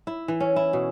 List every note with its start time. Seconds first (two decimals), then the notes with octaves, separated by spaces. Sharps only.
0.07 E4
0.28 E3
0.40 C#4
0.56 E4
0.73 B2